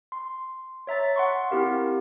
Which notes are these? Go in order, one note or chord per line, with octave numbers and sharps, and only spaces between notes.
C6
C#5 E5 A#5 A6
F#5 C6 C#6
C4 E4 G4 A#4 F5